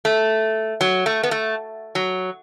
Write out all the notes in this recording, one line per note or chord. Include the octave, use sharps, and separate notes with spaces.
A3
F#3
A3
B3
A3
F#3